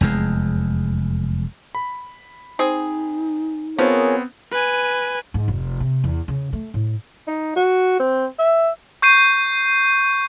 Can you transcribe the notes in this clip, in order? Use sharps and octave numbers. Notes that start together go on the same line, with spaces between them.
F1 E2 A#2 G#3
B5
C4 D#4 G#4
F3 B3 C4 G#4 A#4 C#5
B4 G#5
G#2
F1
C3
E2
C#3
A3
A2
D#4
F#4
C4
E5
C#6 G6 C7 D#7